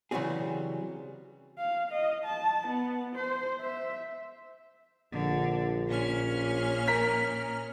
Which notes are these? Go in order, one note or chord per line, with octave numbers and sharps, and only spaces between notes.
C#3 E3 F#3 G3 C4 G#4
F5
D#5
A5
B3
C5
E5
A#1 D3
A#2 C#4 F6
A#4 B6